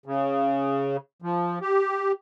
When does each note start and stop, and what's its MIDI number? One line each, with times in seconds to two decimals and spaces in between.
0.06 0.97 49
1.22 1.59 53
1.61 2.12 67